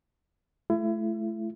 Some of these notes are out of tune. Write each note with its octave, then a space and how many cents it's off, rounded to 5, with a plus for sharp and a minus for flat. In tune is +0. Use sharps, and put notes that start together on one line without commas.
A3 -30 E4 +35